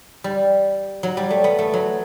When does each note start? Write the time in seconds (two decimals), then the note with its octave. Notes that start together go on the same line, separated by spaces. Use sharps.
0.24 G3
1.03 F#3
1.17 G3
1.30 A3
1.44 B3
1.59 A3
1.73 F#3